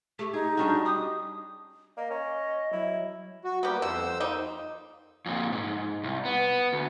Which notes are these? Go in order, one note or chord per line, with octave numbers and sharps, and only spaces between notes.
A3 G4
D#4 G#4
G3 C#4 D4 F#4
G4 D#6
A#3 D#5
C#4
F#3 E4
F#4
G3 A#3 B3 G4
F2 B2 C5 E6
G3 A#3 D#4
F2 A#2
G#2
C2
B3
D2